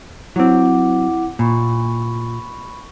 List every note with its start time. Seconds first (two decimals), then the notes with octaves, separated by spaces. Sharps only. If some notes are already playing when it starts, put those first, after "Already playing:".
0.36 F#3 C4 E4 F#5 D6
1.39 A#2 B5 C#6